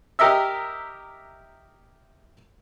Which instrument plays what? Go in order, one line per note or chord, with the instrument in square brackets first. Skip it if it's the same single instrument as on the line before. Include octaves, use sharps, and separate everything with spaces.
[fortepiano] G4 A#4 D#5 E5 E6